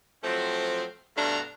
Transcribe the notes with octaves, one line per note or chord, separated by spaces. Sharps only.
F3 F#3 A3 C4
G2 B2 A3 D4 F5 A#5